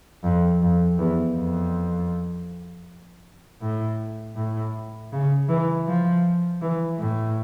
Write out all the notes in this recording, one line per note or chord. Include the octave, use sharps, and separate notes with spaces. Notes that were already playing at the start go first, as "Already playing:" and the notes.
F2
F2
E2
F2
A2
A2
C#3
E3
F3
E3
A2